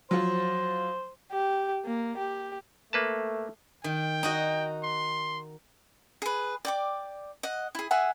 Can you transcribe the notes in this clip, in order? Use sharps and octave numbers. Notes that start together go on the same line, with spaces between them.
F3 F#3 C5
G4
A#3
G4
A3 A#3 B4 A5
D#3 G5
D#4 F#4 D#5
C6
G#4 B4
D5 G5 D6
D#5 F#5
E4 G#4
G#4 E5 F#5 G#5